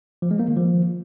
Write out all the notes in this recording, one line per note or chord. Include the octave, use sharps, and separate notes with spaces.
F3
G#3
A#3
D#3
F3